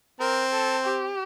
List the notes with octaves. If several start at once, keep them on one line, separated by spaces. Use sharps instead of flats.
C4 A#4
A4
G4